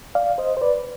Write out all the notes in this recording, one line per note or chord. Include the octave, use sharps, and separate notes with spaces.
D5 F5
C5 D#5
C5
B4 D5